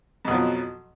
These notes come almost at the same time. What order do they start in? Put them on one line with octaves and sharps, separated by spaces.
F2 B2 F#3 F3